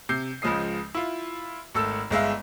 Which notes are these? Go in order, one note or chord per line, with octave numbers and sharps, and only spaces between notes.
C3 G6 C7
C#2 C#3 F3 G#3 D#6 C7
E4 F4
G#1 A3 A4 E6
G1 G#3 E5 F5